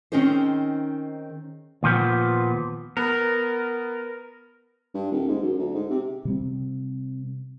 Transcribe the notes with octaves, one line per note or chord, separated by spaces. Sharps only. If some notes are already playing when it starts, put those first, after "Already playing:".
D#3 C4 C#4 D#4 G#4 C5
D#2 A#2 F3 B3
B3 A#4
G2
D#1
G#2
F#2
D2
G#2
C3
C3 G3 C4